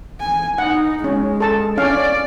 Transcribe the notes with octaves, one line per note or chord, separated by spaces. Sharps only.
G#5
D#4 F#5
G#3 C#4
A4 A5
C#4 D5 F5